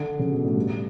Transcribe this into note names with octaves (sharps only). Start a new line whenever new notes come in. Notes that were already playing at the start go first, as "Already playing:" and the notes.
Already playing: D3
C#3
B2
A2
G2